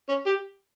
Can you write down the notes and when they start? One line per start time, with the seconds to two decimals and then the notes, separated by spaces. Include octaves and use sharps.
0.08 C#4
0.26 G4